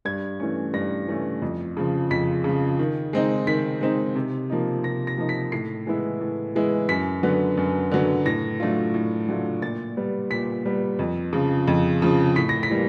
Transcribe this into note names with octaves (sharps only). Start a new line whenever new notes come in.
G2 G#6
E3 A3 C#4
G2 A#6
E3 A3 C#4
F2
C#3 F3
F2 B6
C#3 F3
D#3
G#3 C4 D#4
D#3 B6
G#3 C4 D#4
C3
F3 A#3 D#4
C3 A#6
A#6
F3 A#3 D#4
B6
A2 C7
E3 G#3 B3 E4
A2
E3 G#3 B3 E4
F#2 B6
D3 F#3 B3
F#2
D3 F#3 B3
A2 A#6
F#3 A3 D4 F4
A2
F#3 A3 D4 F4
A#2 A6
G3 B3
A#2 B6
G3 B3
F2
C#3 F3
F2
C#3 F3
A2 B6
A#6
B6
E3 G3 A#3